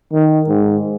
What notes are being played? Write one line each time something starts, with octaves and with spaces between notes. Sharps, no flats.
D#3
G#2